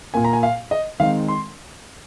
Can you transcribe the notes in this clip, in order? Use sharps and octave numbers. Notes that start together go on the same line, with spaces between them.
A#2 A#3 G#5
A#5
G#5
F5
D#5
D#3 G#3 C4 F5
C6